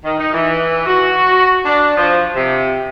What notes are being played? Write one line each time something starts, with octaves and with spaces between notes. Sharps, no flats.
D#3
D#4
E3
F#4
D4
F3
C3